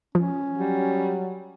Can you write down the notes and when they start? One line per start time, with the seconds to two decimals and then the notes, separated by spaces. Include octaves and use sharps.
0.15 F3 C#4
0.57 F#3 G3